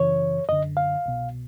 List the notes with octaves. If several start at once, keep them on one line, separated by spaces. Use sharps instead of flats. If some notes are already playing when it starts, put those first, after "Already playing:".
Already playing: F#2 C#3 E3 C#5
F#2 D3 D#5
F5
C2 B2